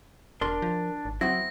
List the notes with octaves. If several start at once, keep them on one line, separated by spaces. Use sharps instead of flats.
E1 D4 A#4 C6
F3
G#1
F#3 B3 C4 E4 A#6